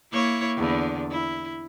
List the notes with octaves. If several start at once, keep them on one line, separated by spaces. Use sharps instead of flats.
A#3 E4 C#5
E2 D3
E4